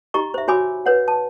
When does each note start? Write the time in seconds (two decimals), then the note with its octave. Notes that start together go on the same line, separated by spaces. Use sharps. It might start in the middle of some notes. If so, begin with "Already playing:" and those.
0.14 D#4 G4 D#5 A#5 C#6
0.34 C5 E5
0.48 F#4 C#5 G#5 B5 D6 E6
0.86 B4 C#5 F#5
1.08 A5